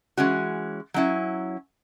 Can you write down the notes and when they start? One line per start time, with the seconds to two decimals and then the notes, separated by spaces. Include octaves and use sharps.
0.17 E3 G#3 C#4 F#4
0.94 F#3 C#4 E4